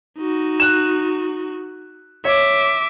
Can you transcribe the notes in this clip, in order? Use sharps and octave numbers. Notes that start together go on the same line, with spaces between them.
D#4 F#4
F#6 E7
C#5 E5 D6